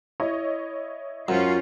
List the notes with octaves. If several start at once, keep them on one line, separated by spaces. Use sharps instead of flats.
E4 C#5 D#5
F#2 C#4 F4 C5